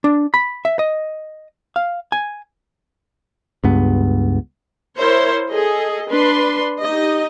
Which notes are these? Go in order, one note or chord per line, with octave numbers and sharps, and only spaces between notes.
D4
B5
E5
D#5
F5
G#5
C#2 G2 B3
E4 A#4 C5 C#5
G#4 A4 D#5
D4 B4 C6
D#4 G4 D#5